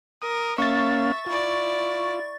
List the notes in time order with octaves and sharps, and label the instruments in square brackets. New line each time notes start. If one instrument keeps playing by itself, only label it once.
[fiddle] A#4 [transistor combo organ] D#6
[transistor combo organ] A#3 C#4 F5 [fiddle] E5 [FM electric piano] C#6 A6
[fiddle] E4 D5 [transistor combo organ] F4